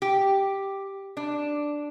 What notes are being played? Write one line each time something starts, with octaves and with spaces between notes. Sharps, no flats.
G4
D4